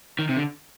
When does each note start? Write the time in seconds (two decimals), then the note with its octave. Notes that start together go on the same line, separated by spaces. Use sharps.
0.19 D#3
0.29 C3
0.37 D3